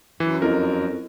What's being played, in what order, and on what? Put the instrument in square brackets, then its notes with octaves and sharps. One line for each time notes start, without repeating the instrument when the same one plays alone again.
[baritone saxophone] F#2 [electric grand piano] E3
[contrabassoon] F2 [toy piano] E4 A4 D#5 [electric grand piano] A#4